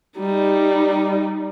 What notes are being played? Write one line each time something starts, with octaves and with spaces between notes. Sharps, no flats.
G3 D#4